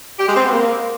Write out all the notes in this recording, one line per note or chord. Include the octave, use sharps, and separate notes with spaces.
G4
G#3
C4
B3
A#3